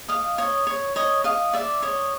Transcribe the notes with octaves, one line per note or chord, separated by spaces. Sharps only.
D#5 F5
C#5 D#5
C#5
C#5 D#5
D#5 F5
D5 E5
C#5 D#5